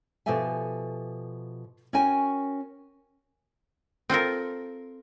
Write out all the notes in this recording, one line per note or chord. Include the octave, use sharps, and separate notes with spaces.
B2 F3 G4 A4 E5 G#5
C#4 F#4 A#4 C#5 G5 G#5
C4 F4 A4 A#4